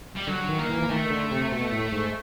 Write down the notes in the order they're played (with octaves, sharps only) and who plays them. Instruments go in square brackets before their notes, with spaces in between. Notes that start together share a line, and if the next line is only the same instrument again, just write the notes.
[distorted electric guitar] G3
[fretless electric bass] D3 [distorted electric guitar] F#3
[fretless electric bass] D#3
[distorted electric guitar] A#3
[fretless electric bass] E3
E3
[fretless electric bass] D#3 [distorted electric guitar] A3
[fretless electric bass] D3
C3
B2
A2
G#2